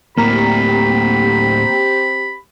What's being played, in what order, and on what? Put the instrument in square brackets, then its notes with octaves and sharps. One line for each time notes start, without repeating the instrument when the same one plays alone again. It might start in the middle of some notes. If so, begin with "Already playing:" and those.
[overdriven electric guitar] D2 A2 [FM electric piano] A#3 A#5 [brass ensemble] C4 G4 [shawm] B5